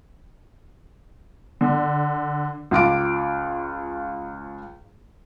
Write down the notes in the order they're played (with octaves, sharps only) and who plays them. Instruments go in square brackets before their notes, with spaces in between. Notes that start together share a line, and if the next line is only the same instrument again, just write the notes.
[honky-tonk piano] D3
[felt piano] C#2 F4 D6 D7